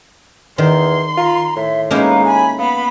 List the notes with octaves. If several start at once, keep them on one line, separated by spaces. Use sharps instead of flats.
E2 D#3 C6
F4 A#5
A2 E5
G#3 A#3 C#4 D#4 B4 F5
G#5 B5
B3 F5 B5